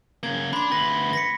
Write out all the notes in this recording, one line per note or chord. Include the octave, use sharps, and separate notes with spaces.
C#3 A#3 G#6
D4 B5 C6
D2 B4 A#6
A#6 B6 C#7